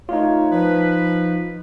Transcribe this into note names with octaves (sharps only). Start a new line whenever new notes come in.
A3 D#4 F4 A#4 C#5
F3 B4